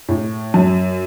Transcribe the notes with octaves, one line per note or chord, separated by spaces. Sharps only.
A2
F#2